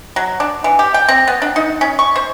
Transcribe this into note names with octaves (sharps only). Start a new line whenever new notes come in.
F#3
D4
E3
G4
G5
C4
B3
D4
D#4
C#4
C#6
C5